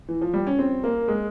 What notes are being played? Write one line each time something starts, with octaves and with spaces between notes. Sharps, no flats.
E3
F3
G3
C#4
C4
A#3
G#3